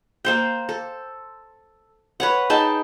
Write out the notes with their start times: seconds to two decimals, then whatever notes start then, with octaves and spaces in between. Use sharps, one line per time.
0.25 A#3 C5 G5
0.69 A4
2.20 B4 C#5 F#5
2.50 D#4 G#4 G5 A5